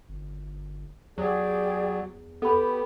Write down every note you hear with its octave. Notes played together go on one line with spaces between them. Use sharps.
G1
E2 F#3 G4 G#4 D5
B3 G4 A4 B5